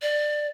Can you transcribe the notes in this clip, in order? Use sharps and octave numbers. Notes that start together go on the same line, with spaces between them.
D5